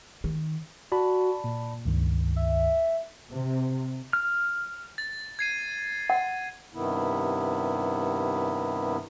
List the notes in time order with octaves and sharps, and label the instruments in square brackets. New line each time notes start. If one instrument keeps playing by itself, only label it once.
[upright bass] D#3
[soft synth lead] F#4 [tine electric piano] D5 A5 B5
[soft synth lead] A#2
[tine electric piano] C#2 G2 D#3
[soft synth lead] E5
[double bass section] C3
[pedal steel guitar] F6
[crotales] A6
G#6 C7 D#7
[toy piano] F#5
[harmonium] G2 C3 D#3 B3 E4